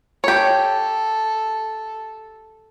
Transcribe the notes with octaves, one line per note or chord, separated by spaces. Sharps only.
G4 A4 C#5